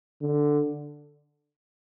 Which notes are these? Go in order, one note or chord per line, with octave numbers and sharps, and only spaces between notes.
D3